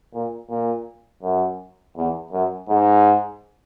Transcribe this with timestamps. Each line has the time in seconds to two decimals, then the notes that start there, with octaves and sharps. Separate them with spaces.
0.14 A#2
0.49 A#2
1.23 F#2
1.96 E2
2.32 F#2
2.68 G#2